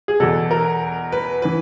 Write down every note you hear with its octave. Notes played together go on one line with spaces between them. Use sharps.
G#4
E2 B2 A4
A#4
B4
E3 B4